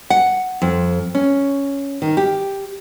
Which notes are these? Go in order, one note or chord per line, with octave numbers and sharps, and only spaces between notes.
F#5
F2
C#4
D#3
G4